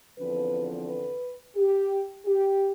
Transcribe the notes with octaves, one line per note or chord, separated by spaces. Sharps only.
E2 D3 F3 C4 B4
B4
G4
G4